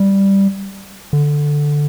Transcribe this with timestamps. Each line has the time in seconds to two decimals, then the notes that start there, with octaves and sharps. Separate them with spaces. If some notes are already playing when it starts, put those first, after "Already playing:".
Already playing: G3
1.13 D3